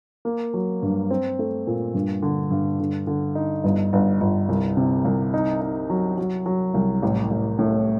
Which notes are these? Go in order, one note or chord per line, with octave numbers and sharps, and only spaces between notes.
A#3
F#3
G2
C4
A3
A#2
G2
D3
G2
D3
D3
D#4
G1
G1
G1
C2
C3
C2
D#4
D#4
F#3
F#3
F#3
C2
A1
A1
A2